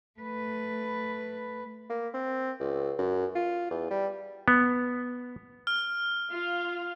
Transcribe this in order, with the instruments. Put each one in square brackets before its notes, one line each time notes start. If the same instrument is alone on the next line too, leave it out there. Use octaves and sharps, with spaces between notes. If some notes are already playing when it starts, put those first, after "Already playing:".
[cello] A3 B4
[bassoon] A#3
C4
C#2
F#2
F4
E2
G3
[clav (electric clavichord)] B3
[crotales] F6
[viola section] F4 F5